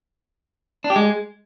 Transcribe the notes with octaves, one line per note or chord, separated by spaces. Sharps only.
D4
G4
G#3